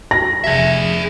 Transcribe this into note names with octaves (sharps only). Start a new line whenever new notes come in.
A#6
F1 G#4 E5